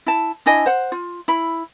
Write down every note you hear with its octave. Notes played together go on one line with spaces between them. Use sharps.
E4 A5
D4 E4 D#5 G#5
C5 F#5
F4
E4 B5